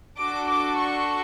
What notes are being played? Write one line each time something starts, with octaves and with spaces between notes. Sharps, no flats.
D4 F#4 A4 D6
D6
C#6